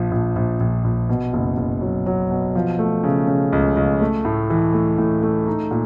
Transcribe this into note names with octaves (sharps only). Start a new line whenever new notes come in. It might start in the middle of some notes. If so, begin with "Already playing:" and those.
Already playing: A#1 F3
A#1
A#1
A#1
A#1
B2
F#1
F#1
F#3
F#3
B2
F3
A3
C#3
C#3
C#2
C#2
A3
A2
E3
A3
A2
A3
D#4
A#2